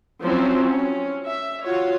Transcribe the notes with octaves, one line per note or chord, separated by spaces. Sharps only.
F3 F#3 C4 C#4 E4
C#4
E5
F4 F#4 C#5